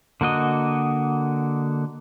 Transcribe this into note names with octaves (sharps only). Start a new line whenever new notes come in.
D3 A#3 F#4 D#5